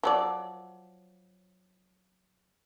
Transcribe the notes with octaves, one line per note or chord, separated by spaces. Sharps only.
F3 F#3 D5